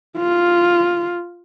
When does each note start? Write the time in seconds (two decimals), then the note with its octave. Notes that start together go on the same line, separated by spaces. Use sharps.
0.18 F4